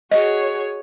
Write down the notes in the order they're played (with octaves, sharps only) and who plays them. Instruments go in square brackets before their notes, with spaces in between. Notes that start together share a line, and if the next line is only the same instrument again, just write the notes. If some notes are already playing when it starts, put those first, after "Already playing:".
[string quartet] F#4 G#4 C#5 [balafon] D#5